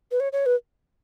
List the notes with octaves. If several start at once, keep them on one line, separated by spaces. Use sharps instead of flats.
B4
C#5
C#5
B4